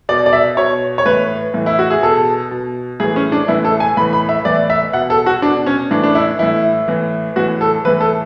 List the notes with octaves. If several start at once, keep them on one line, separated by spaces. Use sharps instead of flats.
B2 D5
D5
E5
B2 C#5
C#5
A2 E3 B4
A2 E3
E4
F#4
G#4
B2 A4
B2
A2 E3 G#4
C#4
D4
A2 E3 E4
A4
G#5
A2 E3 B5
B5
E5
A2 E3 D5
E5
B2 F#5
A4
F#4
B2 D4
C#4
A2 E3 D4
D4
E4
A2 E3 E4
A2 E3
A2 E3 F#4
A4
A2 E3 B4
A4